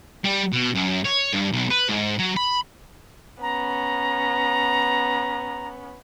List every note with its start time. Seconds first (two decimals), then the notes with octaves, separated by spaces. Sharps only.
0.24 G3
0.53 B2
0.75 F#2
1.05 C#5
1.33 G2
1.53 B1
1.70 B4
1.89 G#2
2.19 F#3
2.36 B5
3.42 B3 C#4 A#5